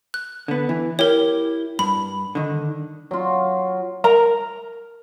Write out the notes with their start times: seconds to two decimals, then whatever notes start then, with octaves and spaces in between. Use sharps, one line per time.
0.14 F#6
0.48 D3 B3
0.69 E3
0.99 E4 G4 A#4 C#5
1.79 G2 B5
2.35 D3 D#3
3.11 F#3 F4
4.04 A#4 A#5